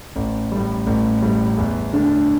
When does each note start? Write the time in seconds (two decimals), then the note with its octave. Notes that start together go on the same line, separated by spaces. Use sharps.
0.16 A1
0.52 A2 G3
0.86 A1
1.22 A2 G3
1.58 E2
1.93 D3 A3 D4